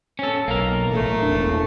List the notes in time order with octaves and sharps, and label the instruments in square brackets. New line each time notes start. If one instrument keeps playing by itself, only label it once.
[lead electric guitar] C#4 A4
[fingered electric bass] B1 [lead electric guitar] A#3 A#4
[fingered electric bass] A1 [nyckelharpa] A3 A4
[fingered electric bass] E1 D4